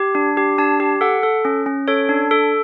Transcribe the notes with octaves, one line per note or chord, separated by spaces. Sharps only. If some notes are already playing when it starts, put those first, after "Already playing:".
Already playing: G4
D4
G4
D4 A5
G4
A4 F#5
A4
C#4
C#4
A4 C#5
D4
A4